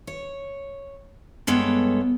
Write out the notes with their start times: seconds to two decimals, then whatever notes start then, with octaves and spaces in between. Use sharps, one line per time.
0.07 C#5
1.47 G2 G#3 B3 A4 C#5 G5